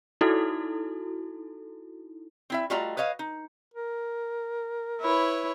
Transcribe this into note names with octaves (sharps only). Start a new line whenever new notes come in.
D#4 E4 F#4 A4
C4 E4 E5
G3 A3 F4 F#4 D#5 A#5
B4 C#5 D#5 F5
D#4
A#4
E4 B4 C#5